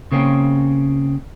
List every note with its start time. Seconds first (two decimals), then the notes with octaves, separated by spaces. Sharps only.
0.12 C#3 A#3 C4 C#4